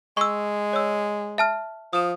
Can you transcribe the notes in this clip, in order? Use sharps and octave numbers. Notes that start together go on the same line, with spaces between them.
G#3 C#6 E6
C#5 E6
E5 A5 F6
F3 D#6 E7